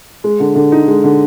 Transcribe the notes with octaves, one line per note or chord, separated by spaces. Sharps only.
G#3
D3
D3
D#4
G#3
D3